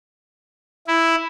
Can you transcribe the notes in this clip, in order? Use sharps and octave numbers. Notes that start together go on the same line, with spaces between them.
E4